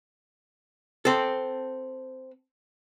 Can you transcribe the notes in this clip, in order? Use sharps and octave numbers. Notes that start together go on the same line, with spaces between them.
C4 A4